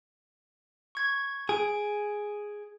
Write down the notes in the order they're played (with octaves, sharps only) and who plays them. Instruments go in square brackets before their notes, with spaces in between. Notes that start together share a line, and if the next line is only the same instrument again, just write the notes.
[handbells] C#6 G#6
[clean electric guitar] G#4 [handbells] D7